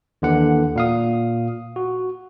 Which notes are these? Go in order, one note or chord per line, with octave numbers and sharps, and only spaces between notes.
D#2 D3 E3 F#5
A#2 F5 D#6
F#4